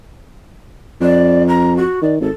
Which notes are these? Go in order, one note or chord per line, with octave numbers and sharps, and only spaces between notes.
F2 D5
A#5
F#4
D#3 D5
G#1 A4